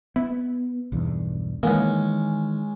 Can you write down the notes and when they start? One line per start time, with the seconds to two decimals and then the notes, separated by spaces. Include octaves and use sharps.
0.16 B3 E4
0.92 B1 E2 G2
1.63 D#3 E3 G#3 A#3 B3 C#4